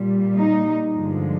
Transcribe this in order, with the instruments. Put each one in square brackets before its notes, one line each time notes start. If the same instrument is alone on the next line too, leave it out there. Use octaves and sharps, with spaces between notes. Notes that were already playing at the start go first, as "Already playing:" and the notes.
Already playing: [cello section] A#2 G3
D#4
G2 D3 F3 G#3